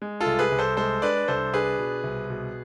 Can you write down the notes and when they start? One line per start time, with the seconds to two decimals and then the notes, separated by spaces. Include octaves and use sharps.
0.02 G#3
0.20 F4 A4
0.26 C2
0.39 G#4 B4
0.52 C2
0.59 A4 C5
0.77 G#3 A4 C5
1.02 D4 B4 D5
1.28 C2 A4 C5
1.53 D4 G#4 B4
1.79 B2
2.04 C2
2.30 B2